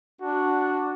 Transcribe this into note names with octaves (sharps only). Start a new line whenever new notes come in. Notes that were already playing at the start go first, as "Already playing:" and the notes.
D4 F#4